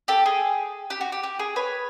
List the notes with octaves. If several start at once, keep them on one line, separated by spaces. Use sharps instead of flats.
G4 A4
G#4
G4
F#4
G4
G4
G#4
B4 C#5